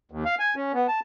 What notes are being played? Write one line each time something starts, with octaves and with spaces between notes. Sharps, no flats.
D#2
F5
G#5
C#4
B3
A5